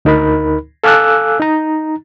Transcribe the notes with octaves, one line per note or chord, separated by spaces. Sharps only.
D2 D#4 A#4 B5
A4 F5 G#5 D6 E6 F#6
D#4 A#5